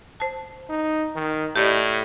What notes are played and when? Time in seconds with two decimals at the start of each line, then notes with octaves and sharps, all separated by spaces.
0.20 C5 A5
0.70 D#4
1.15 D#3
1.56 A2 G4 D5 D#5